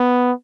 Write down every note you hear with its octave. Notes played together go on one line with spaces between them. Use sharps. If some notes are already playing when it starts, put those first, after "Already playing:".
Already playing: B3